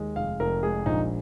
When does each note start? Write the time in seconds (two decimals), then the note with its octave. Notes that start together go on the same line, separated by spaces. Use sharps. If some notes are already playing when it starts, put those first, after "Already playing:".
Already playing: D#2 G#3
0.16 F1 F5
0.40 F1 A#4
0.63 G#3 G#4
0.86 A#1 D#4